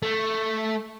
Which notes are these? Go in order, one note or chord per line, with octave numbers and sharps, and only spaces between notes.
A3